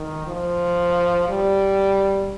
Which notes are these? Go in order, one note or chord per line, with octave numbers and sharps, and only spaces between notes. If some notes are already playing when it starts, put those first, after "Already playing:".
Already playing: D#3
F3
G3